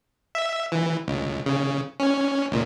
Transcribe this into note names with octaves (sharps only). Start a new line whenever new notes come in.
E5
E3
C#2
C#3
C#4
C#2 A#2